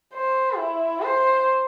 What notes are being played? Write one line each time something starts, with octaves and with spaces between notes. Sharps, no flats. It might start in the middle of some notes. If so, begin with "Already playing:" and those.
C5
E4
C5